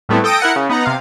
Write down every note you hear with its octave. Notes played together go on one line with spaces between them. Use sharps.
A2 G3 A3 B3 C4 E4
A4 G5 D#6 A#6 D7
E4 A#4 F#5 C#7
C#3
B3 D#4 F#5 A#5
C3 F5